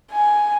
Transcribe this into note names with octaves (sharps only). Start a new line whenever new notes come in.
G#5